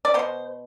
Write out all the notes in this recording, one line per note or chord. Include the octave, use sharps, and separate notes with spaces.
D5
B2 B3 C5